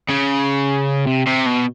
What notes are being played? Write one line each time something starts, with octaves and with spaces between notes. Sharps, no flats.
C#3
C3
C3
B2